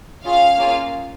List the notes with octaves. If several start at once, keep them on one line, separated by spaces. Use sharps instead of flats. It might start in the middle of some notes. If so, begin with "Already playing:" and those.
C#4 F4 G#4 F5
A#3 C#4 F4 G#4